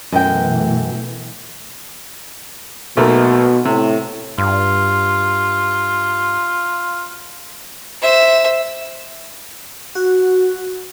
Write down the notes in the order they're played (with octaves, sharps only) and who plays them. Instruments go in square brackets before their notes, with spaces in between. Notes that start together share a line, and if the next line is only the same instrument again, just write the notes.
[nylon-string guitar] F#2 G5 [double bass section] B2 E3 A3
[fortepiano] B1 A3 A#3 [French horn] B2
[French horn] A2 [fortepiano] C3
[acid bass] G2 [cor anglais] F4
[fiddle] C5 E5
[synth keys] F#4